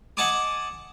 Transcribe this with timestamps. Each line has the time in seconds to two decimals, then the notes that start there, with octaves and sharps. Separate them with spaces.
0.17 D#5 F#5 G#5 A5 D6 D#6